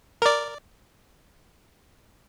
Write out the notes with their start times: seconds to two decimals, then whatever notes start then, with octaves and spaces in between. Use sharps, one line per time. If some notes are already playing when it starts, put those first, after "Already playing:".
0.22 A#4 D5